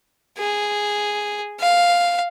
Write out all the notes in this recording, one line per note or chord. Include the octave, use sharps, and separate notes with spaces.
G#4
F5